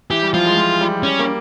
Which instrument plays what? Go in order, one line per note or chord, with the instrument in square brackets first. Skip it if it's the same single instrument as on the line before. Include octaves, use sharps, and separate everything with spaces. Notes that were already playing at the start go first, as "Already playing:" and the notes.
[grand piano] E3 [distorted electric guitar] G4
[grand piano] G3
[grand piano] F3 [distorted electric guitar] F4
[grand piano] G#3
F3
G3
[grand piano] G3 [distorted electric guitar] C#4
[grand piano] A#3